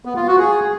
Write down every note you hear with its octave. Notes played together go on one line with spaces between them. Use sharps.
B3
F4
F#4
G#4